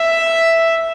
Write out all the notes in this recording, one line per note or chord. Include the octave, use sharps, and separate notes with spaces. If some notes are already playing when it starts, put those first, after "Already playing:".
Already playing: E5